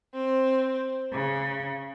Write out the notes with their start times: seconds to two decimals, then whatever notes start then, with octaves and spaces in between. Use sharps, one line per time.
0.14 C4
1.13 C#3